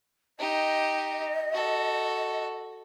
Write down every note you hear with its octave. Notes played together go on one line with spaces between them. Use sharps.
D#4 G4 D#5
F#4 A4